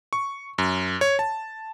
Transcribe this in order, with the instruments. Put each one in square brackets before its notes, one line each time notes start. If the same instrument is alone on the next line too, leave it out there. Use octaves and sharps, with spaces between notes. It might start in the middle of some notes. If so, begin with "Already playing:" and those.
[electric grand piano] C#6
F#2
C#5
A5